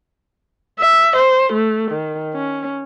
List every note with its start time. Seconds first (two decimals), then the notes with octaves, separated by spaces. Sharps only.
0.79 E5
1.16 C5
1.53 A3
1.91 D#3
2.34 C#4